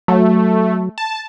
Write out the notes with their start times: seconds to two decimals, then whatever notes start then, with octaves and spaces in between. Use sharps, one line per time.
0.08 F#3 A3
0.98 A5